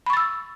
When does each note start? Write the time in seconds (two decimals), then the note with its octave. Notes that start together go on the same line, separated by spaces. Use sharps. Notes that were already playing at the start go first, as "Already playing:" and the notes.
0.06 B5
0.10 C#6
0.13 A6
0.17 E6